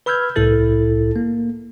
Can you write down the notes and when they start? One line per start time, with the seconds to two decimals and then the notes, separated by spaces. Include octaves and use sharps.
0.06 B4 B5 E6 F6 G6 G#6
0.36 C2 A2 E4 A4 A6
1.16 A#3